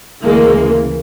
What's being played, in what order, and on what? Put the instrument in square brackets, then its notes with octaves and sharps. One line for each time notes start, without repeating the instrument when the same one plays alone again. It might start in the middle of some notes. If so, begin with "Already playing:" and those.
[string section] D2 C#3 E3 G#3 A#3